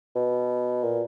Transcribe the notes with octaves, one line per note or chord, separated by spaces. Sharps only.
B2
A#2